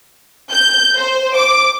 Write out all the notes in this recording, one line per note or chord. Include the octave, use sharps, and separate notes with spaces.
G6
C5
D6